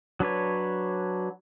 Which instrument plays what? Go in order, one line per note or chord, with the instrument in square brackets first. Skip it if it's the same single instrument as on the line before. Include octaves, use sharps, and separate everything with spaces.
[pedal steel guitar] F#3 D4 B4 C#5